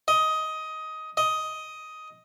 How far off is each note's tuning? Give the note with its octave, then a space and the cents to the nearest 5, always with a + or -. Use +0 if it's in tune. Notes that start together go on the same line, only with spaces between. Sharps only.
D#5 +15
D#5 +10